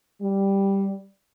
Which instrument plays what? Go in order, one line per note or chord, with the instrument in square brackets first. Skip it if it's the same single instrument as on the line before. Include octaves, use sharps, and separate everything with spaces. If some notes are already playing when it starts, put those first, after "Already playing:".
[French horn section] G3